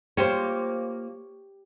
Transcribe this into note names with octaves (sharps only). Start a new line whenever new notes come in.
A#3 F4 G4 C5 C#5